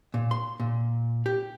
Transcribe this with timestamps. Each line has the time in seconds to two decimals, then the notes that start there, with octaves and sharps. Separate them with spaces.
0.14 A#2
0.31 C6
0.60 A#2
1.26 G4